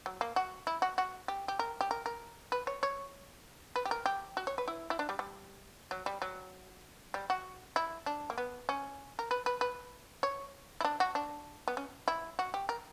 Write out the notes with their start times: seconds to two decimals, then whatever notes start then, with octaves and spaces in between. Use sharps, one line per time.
0.06 F#3
0.21 A#3
0.36 F#4
0.67 E4
0.82 F#4
0.98 F#4
1.28 G4
1.48 G4
1.59 A#4
1.81 G4
1.91 A#4
2.06 A#4
2.52 B4
2.67 C#5
2.83 C#5
3.76 B4
3.86 G4
3.91 A#4
4.06 G4
4.37 F#4
4.47 C#5
4.58 B4
4.68 E4
4.90 E4
4.99 D4
5.09 G3
5.19 G3
5.91 F#3
6.06 G3
6.22 F#3
7.14 G3
7.30 F#4
7.76 E4
8.06 D4
8.30 A#3
8.38 B3
8.69 C#4
9.19 A#4
9.31 B4
9.46 B4
9.61 B4
10.23 C#5
10.81 E4
10.85 D4
11.00 F#4
11.15 D4
11.68 B3
11.77 C#4
12.08 E4
12.39 F#4
12.54 G4
12.69 A#4